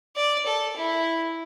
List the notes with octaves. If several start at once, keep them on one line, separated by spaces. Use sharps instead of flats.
D5
A4
E4